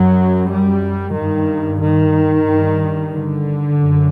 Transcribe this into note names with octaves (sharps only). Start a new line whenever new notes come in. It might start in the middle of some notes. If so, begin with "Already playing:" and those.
Already playing: F#2 F#3
G3
G2 D#3
D#3
G2
D3
F#2